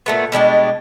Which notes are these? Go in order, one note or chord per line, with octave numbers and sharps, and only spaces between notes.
A#2 A3 B3
B2 G3 G#3 D4